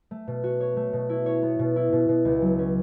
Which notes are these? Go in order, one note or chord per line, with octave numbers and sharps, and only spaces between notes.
A3
B2
F#4
C#5
A3
B2
E4
C#5
B3
B2
E4
B2
B2
C#2
F#3
C#4